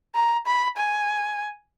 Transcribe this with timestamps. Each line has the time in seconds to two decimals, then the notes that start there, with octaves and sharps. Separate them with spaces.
0.15 A#5
0.46 B5
0.77 G#5